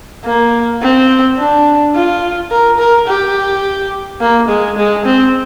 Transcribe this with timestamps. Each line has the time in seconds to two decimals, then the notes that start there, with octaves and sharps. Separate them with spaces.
0.25 A#3
0.82 C4
1.38 D4
1.95 F4
2.51 A#4
2.79 A#4
3.07 G4
4.20 A#3
4.48 G#3
4.77 G#3
5.05 C4